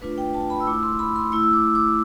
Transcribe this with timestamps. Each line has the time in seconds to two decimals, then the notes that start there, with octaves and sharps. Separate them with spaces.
0.01 A3 D4 F4 B4
0.18 G5
0.34 A5
0.50 B5
0.60 E6
0.67 A3 E4 D6
0.83 C6
0.99 B5
1.16 C6
1.32 A3 E4 E6
1.43 E6
1.53 D6
1.75 D6